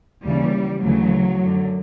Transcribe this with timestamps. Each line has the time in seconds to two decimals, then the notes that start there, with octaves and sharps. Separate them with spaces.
0.25 D#2 C#3 E3 G3
0.84 D2 C#3 E3 F#3
1.42 F#2 D3